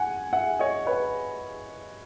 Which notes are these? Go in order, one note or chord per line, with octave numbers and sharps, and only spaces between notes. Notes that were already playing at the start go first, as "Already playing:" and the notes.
Already playing: F#5 G#5
E5 F#5
C#5 D#5
B4 C#5